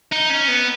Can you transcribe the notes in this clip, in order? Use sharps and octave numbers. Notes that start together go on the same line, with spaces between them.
D#4
C#4
B3